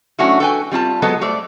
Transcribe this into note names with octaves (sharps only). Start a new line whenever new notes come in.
F#3 A3 C#4 D4 E4 F#4
A4 B4 G5 G#5
G3 C4 F4 A5
F#3 G#3 B3 A4 C5 D#5
G3 A3 C5 D5